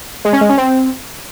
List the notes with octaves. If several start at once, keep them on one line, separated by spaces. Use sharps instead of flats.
G#3
C#4
G#3
C#4
C4